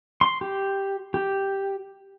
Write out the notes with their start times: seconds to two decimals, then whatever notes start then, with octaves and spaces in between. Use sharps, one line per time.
0.21 C6
0.41 G4
1.14 G4